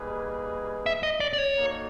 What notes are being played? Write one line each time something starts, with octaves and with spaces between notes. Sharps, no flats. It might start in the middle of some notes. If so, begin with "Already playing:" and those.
Already playing: G3 A#3 D#4 G#4 B4
E5
D#5
D5
D5
C#5
A#3 D#4 F#4 A4